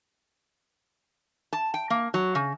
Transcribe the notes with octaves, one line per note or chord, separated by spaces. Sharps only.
A5
G5
A#3
F#3
C#3